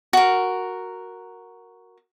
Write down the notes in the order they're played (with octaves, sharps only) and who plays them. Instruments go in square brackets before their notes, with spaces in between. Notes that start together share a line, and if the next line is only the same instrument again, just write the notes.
[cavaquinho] F#4 A#4